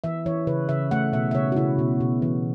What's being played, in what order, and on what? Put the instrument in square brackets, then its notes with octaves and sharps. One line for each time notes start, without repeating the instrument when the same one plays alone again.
[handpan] E3 E5
E3 C#5
C#3 B4
C#3 E5
A3 F#5
B2 E5
E5
C#3 C#5
F#4
C#3 E4
B2
B2
E3